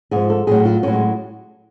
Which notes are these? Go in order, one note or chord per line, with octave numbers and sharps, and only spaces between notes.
G#2 F3 G#4
A4
A2 F#3 G#4
F4
A2 F#3 C#4
G#3